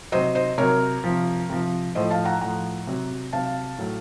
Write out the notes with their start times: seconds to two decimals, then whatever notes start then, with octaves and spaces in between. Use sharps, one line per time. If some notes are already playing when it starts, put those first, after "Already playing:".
0.12 C3 F#3 C5 D#5
0.35 C5 D#5
0.58 C3 F#3 A#4 C#5
1.04 C3 F3
1.50 C3 F3
1.95 A2 F3 C5 D#5
2.11 F5 A5
2.25 F#5 A#5
2.41 A2 F3 F#5 A#5
2.87 C3 F#3
3.33 C3 F#3 F5 A5
3.78 A2 F#3